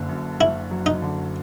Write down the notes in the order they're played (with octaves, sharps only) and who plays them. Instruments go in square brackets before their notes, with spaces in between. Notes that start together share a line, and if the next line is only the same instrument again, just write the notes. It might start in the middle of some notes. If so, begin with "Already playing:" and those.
Already playing: [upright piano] F#1 D3
F#2
[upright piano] F#1 [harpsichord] E4
[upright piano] F#3
[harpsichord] D#4
[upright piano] D3